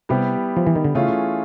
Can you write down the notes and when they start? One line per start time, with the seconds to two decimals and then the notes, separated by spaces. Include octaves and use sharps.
0.09 C3 G3 B3 E4 G4
0.57 F3
0.67 E3
0.75 D#3
0.84 D3
0.94 C#3 E3 A3 C#4 F4 G#4